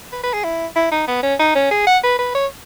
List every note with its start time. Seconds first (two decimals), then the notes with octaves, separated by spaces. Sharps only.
0.13 B4
0.23 B4
0.34 G#4
0.44 E4
0.76 E4
0.92 D#4
1.08 B3
1.23 C#4
1.39 D#4
1.55 C#4
1.71 G#4
1.87 F#5
2.04 B4
2.19 B4
2.35 C#5